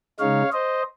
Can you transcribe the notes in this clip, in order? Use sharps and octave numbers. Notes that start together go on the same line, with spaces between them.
C#3 G#3 D#4 C#5 F5
C5 D#5